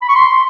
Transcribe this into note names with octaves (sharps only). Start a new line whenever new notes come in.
B5
C#6
C6